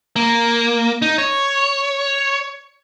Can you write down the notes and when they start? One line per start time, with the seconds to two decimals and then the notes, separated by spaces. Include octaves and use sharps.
0.16 A#3
1.02 D#4
1.18 C#5